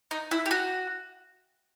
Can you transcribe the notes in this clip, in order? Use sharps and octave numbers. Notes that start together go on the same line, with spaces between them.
D#4
E4
G4
F#4